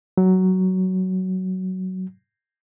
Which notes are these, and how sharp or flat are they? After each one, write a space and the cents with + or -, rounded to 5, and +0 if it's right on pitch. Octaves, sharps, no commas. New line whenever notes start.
F#3 +10